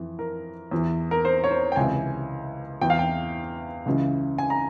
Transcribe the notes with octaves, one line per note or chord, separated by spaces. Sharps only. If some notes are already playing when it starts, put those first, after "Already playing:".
Already playing: F2 E3
A#4
E2 E3
A#4
C5
C#5
C5
G5
C#2 C3 E3 G#5
E2 E3 G5
F5
G5
C#2 C#3 E3
G#5
A#5